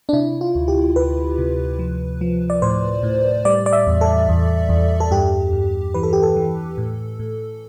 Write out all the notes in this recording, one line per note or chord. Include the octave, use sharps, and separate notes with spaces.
D4
C3 E4
F4
D2
G4
D2 B4
C3
F3
F3
D5
A2 C5
A2
G3 D5
D5
E5
E2
A4
E2
E2
A4
G2 G4
G2
E3 B4
A4
G4
A4
E3
A2
A2